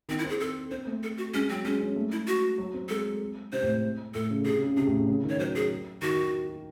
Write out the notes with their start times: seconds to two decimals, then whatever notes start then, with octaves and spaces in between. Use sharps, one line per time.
0.09 D#3 C4
0.19 E4
0.24 C4
0.29 G#4
0.40 A4
0.71 C4 C5
0.87 A3
1.03 A4
1.18 F#4
1.34 G#3 C#4
1.50 F#3 C4
1.65 G#3 C#4
1.80 C#4
1.96 A3
2.12 E4
2.28 F#4
2.58 F#3
2.74 C4
2.89 G#3 A4
3.53 C3 C5
3.63 A2
4.14 A2 A4
4.30 C#3
4.46 C3 G#4
4.56 C#3
4.66 C#3
4.77 C3 G#4
4.87 A2
4.98 A2
5.08 C#3
5.24 D#3
5.29 C#5
5.39 F#3 C5
5.55 G#4
6.02 D#3 F#4